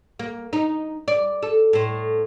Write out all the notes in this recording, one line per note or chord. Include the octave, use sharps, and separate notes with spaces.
A#3
D#4
D5
A4
A2 C5